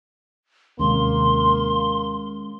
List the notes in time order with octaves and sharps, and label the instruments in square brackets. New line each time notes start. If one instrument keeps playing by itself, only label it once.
[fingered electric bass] D#2 C3 [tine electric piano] G#3 C#4 [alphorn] A#3 [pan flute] C6